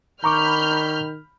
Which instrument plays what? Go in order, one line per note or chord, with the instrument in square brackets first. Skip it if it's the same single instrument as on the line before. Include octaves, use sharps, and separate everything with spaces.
[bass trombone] D#3 [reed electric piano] A#5 C#6 D6 [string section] B5 F6 G6